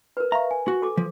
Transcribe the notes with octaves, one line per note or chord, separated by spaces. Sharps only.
A#4 B4
E5 F5 A#5 C#6
G#5
F#4
A4 D6
F3